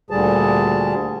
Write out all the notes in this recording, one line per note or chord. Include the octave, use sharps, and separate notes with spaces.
D2 A#2 D3 G3 G#4 A5